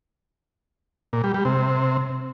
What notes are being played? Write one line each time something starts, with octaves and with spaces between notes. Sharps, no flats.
A#2
G3
G3
C3